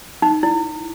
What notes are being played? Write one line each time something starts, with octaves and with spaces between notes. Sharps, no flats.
D#4
E4